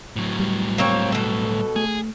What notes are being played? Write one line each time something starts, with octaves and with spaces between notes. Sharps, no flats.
A2 F#3
G3
A#3 C4 C#5
B2 A4
A3 G#4